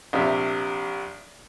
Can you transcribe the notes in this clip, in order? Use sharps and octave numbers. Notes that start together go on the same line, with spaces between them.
A#1 C3 E5